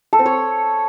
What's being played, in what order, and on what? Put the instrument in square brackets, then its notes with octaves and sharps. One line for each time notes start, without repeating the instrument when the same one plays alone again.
[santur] A4
C4
C#5